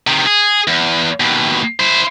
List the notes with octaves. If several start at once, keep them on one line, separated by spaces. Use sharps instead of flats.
C3 D#3
G#4
E2
D#2 B2
E4 C5